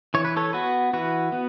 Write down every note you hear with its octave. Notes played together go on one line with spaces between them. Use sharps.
E3 C#5
B4
A4 C#5
B3 F#4 B4
E3 F#4 B4
B3